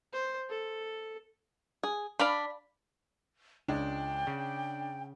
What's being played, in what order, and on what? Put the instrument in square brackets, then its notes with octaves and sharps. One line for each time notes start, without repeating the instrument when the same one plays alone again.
[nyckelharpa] C5
A4
[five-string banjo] G#4
[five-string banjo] D4 [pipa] D5 F5 B5
[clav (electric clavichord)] C#2 G#3 [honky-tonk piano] D4 [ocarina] G5
[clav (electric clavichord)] C#3